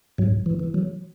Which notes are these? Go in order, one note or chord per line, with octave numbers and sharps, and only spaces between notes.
G#2 F#3
E3
E3
F#3